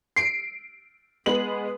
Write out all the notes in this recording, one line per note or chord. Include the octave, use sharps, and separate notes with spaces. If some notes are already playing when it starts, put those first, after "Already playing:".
C7 D7
G#3 B3 F#7